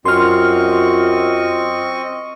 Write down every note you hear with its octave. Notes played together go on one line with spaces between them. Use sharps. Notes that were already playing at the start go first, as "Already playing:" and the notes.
F#2 C4 F4 D#5 C6 C#6 F6